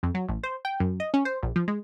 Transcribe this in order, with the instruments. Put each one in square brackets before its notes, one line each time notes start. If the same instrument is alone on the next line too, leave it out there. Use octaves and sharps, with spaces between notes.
[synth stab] F2
F#3
A1
C5
G5
F#2
D#5
C#4
C5
A#1
F3
G#3